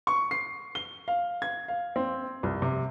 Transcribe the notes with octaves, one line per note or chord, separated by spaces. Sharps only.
C#6
C7
G7
F5
G#6
F5
C4
C2
C3